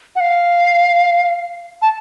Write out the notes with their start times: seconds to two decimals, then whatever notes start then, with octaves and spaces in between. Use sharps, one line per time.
0.16 F#5
0.20 F5
1.82 A5